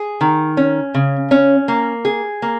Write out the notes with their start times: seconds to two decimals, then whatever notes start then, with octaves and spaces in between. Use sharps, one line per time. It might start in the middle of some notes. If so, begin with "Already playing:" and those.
Already playing: G#4
0.21 D#3
0.57 C#4
0.94 C#3
1.31 C#4
1.68 A#3
2.05 G#4
2.42 A#3